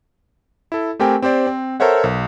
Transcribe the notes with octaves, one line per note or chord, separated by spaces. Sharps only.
E4 A4
A3 C4 G4 A#4 G5 G#5
C4 G4 C5 D5
C4
A4 A#4 C5 C#5 E5 F#5
B1